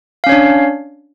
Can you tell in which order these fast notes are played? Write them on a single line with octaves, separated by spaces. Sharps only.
F5 C#4 C#5 D4